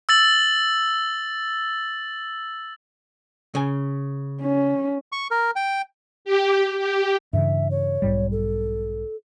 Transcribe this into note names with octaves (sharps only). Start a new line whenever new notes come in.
E6 A6 F#7
C#3 G#5
C#4
C#6
A#4
G5
G4
G4
G2 C#3 E3 E5
C#5
B1 G#2 G3
A4